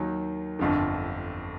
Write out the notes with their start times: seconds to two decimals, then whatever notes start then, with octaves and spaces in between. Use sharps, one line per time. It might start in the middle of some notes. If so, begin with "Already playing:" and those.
Already playing: D#2 D#3 F#3
0.59 G1 F2 D3